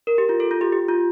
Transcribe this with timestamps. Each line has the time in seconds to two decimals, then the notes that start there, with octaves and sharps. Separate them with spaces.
0.07 A#4
0.18 G4
0.29 F4
0.40 A4
0.51 F4
0.61 G4
0.72 G4
0.88 F4